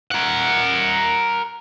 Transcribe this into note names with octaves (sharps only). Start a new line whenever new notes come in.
A#4 F#5